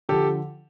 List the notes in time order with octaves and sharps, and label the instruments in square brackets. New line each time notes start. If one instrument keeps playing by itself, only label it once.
[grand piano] D3 F3 G4 A4